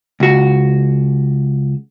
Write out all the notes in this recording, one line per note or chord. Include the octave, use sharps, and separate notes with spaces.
C#2 F#4